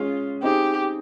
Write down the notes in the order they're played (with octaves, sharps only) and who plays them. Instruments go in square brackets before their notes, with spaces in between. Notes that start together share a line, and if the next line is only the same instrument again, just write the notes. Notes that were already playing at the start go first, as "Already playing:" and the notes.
Already playing: [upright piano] G#3 C#4 G#4 [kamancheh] F4
[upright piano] C4 D#4 G#4 [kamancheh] G4